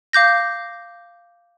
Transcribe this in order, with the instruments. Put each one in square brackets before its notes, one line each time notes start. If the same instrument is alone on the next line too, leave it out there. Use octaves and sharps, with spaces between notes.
[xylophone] F5 D6 G6 A#6